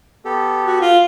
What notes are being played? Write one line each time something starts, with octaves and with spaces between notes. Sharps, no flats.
B3 G4 A4
F#4
F4